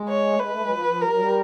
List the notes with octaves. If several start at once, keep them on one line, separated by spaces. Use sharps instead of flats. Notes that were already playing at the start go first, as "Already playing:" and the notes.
Already playing: G#3
C#5
A3
G#3 B4
A3
G#3
F#3
F3
F3
G3 A#4
F#3
G3